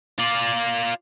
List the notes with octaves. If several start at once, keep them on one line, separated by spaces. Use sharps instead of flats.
F4 D5